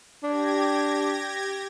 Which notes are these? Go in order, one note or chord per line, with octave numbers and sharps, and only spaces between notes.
D4 G4 G#6 A#6